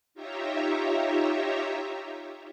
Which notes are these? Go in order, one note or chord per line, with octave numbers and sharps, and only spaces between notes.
D#4 F4 G4 C#5 E5 A#5